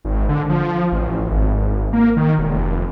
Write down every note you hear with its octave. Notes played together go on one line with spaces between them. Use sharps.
G#1
D3
F3
A1
G#1
A#3
D#3
E1
F1